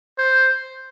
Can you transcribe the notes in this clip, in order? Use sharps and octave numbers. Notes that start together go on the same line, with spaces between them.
C5